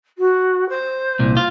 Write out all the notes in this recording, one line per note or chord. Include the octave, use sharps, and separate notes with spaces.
F#4
C5
C2 A#2
F4